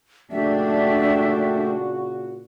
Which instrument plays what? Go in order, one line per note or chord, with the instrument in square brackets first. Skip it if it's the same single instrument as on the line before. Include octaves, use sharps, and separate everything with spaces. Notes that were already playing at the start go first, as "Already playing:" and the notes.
[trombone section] A#2 C#3 F#4 [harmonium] A3 G4 [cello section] D4 [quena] E5